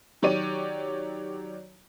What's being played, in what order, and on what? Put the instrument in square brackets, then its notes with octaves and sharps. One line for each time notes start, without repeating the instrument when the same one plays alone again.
[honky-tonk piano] D#3 F#3 G4 C#5 D5 D#7